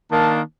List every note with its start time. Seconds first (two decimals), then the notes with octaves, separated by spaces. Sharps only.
0.11 D#3 A#3 D4 A5